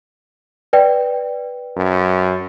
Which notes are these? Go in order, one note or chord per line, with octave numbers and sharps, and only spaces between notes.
B4 D5 G5
F#2